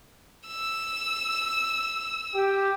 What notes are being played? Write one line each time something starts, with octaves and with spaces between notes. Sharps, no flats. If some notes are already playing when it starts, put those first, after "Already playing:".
E6
G4